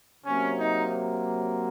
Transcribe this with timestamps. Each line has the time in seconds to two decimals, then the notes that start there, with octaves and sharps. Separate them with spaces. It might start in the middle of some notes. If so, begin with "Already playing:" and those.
0.25 C3 F#3 A#3 C#4
0.58 D#4